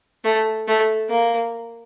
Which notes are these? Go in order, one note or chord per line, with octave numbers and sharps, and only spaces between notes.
A3
A3
A#3